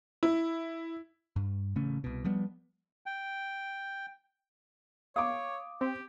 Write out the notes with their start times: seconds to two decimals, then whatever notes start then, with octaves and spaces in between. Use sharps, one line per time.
0.23 E4
1.36 G2
1.76 A1 C#3 A3 C#4
2.04 C2 B2
2.25 F3 G3 B3
3.06 G5
5.16 C#5 F5 D6 D#6
5.81 C4 G4